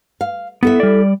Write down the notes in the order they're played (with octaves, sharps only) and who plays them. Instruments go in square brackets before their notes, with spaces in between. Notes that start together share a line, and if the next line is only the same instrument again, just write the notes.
[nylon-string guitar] F5
[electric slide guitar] B3 [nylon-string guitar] E4 A4 E5
[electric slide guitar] G3 D5